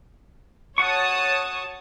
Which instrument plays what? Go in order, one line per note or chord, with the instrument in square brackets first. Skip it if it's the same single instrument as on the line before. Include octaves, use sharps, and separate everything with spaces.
[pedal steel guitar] F#4 C#6 [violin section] C#5 A5 D#6